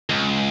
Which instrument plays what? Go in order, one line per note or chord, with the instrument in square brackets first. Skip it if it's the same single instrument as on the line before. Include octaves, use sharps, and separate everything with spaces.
[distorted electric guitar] C#2